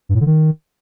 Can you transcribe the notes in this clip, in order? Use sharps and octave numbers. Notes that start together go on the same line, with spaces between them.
G2
A2
D3
D#3